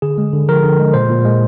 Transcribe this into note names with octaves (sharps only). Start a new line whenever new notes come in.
D3 G#4
G#3
D3
F3 A#4
D3
G#3
A#2 C5
A#2
G#3